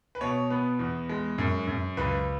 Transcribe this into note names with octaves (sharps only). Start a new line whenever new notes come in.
B4
B2 C#5
B3 B4
E2
G#3
F#2
F#2
C#2 B4